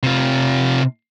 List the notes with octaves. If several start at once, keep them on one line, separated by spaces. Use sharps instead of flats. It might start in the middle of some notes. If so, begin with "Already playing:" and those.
C3 F4